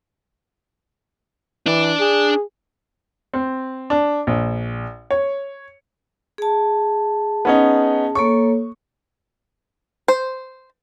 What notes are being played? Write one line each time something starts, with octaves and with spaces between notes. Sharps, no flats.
E3 D4 D5
G#4
C4
D4
A#1
C#5
G#4 A5
B3 C#4 D#4
A#3 A4 C#5 C#6
C5